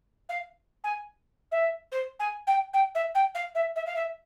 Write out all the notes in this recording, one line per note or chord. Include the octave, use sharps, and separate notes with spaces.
F5
G#5
E5
C5
G#5
G5
G5
E5
G5
F5
E5
E5
F5
E5